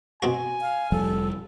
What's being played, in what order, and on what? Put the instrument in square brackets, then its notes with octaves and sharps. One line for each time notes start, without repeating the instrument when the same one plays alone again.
[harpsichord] B2 C4 F#4 [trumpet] G#5
[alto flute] F5
[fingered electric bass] F1 F3 G3 [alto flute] A4